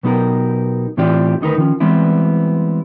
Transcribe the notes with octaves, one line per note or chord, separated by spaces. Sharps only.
B2 F#3 B3 D#4 G4 A#4
A2 E3 C4 F4 G4 D5
D2 D#3 D#4 A#4 B4
D#3 F3 C#4 F4
E3 G3 G#3 B3 C4 E4